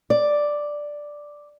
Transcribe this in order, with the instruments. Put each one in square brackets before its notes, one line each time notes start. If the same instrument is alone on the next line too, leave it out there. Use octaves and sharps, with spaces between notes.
[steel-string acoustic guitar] D5